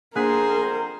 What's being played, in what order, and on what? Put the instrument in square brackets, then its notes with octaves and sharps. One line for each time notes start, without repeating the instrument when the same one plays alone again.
[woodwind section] F2 B3 C5 [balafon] A#3 D4 [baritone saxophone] G#4 [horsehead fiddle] A#4